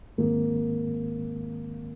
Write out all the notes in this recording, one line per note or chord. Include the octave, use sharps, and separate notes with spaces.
G#2 D#3 G#3 A#3 C4